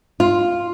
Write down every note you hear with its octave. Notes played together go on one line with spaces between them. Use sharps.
F4